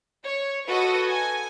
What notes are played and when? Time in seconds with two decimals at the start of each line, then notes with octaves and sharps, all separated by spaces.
0.25 C#5
0.67 F#4 A4 B4 D#5 D#6 A#6
1.03 G#5